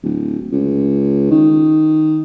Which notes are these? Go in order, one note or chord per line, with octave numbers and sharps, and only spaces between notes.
D1
C#2
D#3